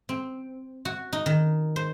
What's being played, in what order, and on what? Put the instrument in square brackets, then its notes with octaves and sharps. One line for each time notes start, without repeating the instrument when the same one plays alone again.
[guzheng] C4
F#4
D#4
D#3
C5